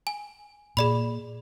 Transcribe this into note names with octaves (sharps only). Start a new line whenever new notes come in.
G#5
A#2 G#4 D5 B5